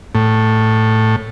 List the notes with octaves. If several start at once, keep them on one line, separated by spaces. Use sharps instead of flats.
A2